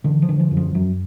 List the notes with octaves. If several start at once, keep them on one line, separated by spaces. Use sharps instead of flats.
D3 E3
F3
D3
F3
F#2
F3
F#2 F#3